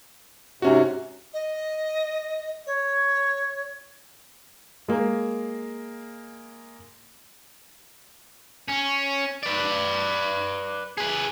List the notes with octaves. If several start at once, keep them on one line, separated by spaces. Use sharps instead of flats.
G#2 C3 C#4 F#4
D#5
C#5
G#3 A#3
C#4
B4 D5
G#4 B4